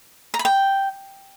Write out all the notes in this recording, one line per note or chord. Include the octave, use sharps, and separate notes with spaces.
A#5
B5
G5